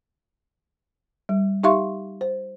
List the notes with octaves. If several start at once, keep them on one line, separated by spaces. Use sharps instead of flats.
G3
D#4 G4 E5 F5 C6 C#6
C5